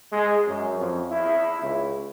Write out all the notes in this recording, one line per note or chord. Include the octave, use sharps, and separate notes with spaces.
G#3
F#2
F2
E4
C#2